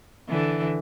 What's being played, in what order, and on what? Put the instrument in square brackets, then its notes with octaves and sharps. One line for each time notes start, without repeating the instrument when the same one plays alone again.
[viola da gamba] D3 E3